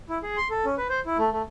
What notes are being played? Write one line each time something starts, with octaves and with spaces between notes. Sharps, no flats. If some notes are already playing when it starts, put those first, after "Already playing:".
E4
G#4
C6
A4
C#4
B4
C5
E4
A3
A3